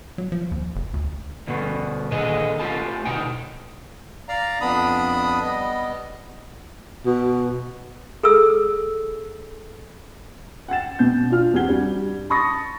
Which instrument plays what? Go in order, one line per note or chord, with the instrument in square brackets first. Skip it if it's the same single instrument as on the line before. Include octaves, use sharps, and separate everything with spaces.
[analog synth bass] F#3
F3
D#2
F#1
D2
[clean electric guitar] D2 G2 B2
D#2 A#2 D3 G#4 D#5
A3 C4 F4 G4 G#5 A5
D2 B2 D#4 G5
[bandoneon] D5 F5 A#5
F2 B3 D4 B5 D#6
G3 B3 D#5
[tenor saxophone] B2
[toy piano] G#4 A4 E6
[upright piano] F#5 G5 A6 E7
B2 G6
D4 F4 F6
E2 C4 G4 F#5 G#6 G7
G2 G3 F#4
A5 B5 C#6 D#6 A6 A#6